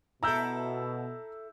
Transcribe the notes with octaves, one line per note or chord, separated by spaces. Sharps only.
B2 E4 A4 A#5 E6 G6